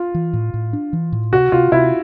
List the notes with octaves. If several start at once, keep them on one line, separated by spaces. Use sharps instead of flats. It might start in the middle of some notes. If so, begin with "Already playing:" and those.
Already playing: F4
E3
A2
A2
D4
E3
A2
C3 F#4
C3 F4
C3 E4